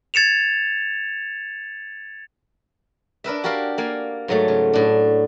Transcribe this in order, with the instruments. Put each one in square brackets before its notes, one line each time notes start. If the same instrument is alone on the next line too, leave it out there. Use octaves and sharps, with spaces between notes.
[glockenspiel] G#6 A6 C#7 E7 F7
[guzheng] D4 A#4 B4 E5
F#4 G4 A#4 D5 F5
A#3 D5 F5 G#5
G#2 F#3 A3
C#3
A2 D4